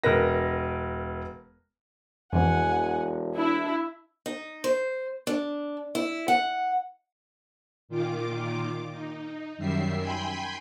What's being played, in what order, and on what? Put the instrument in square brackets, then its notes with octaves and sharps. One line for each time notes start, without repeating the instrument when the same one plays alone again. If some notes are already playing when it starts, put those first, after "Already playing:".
[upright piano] E1 A#4 B4 A#6
[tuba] E1 [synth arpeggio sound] F2 B2 E3 [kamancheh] F#5 G#5
[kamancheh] D4 [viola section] E4
[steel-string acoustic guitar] D#4
C5
D4
E4
F#5
[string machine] A#2 D#3 F4 D6
D#4
F#2 D#3 G3 E5 C7
G5 G#5 B5 C6 G6